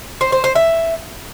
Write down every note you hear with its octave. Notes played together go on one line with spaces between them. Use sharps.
C5
C5
C5
E5